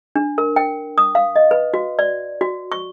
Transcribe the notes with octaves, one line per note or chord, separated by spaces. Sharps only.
D4
A#4
G5
D#6
F5
D#5
B4
F#4
D5
F#4
C#6